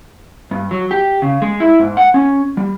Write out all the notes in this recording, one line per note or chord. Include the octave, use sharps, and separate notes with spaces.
G2
F#3
G4
C#3
G#3
E4
G#2
F#5
C#4
G3